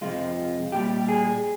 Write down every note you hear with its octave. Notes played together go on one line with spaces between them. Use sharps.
F2 C3 F3 G#3 F4
A#2 G3 G4
G#4